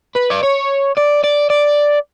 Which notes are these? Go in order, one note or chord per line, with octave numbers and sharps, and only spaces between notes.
B4
D5
C#5
D5
D5
D5